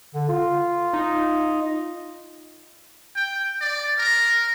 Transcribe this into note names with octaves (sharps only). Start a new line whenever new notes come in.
D3
F4
D#4
G5
D5
A#4